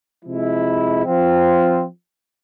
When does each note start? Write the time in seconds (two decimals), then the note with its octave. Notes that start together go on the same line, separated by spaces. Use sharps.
0.24 C3 F3 G#3 E4
1.05 F3 C4 F4